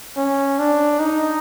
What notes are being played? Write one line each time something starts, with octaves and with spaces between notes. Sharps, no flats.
C#4
D4
D#4